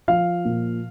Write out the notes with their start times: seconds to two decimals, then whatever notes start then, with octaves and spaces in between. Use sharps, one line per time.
0.08 F3 F5
0.45 A#2